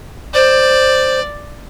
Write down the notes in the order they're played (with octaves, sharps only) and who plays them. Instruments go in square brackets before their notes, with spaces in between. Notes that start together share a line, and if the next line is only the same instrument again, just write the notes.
[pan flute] C5 [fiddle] D5